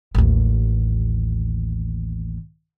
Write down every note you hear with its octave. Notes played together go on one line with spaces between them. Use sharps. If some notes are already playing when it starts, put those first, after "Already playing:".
A1 D#2